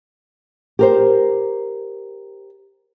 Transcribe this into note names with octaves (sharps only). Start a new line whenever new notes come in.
G4 A#4 C5